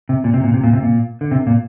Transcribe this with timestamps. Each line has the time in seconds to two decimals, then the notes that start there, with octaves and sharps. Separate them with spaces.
0.09 C3
0.24 A#2
0.34 C3
0.44 A#2
0.54 C3
0.64 A#2
0.73 C3
0.83 A#2
1.21 D3
1.31 C3
1.47 A#2